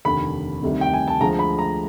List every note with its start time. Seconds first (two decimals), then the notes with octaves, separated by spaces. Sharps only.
0.05 F1 D#2 D3 B5
0.63 D2 C3 D#3 G3
0.81 G5
0.94 G#5
1.08 A5
1.21 D2 D3 F3 G#3 A#5
1.39 B5
1.59 A#5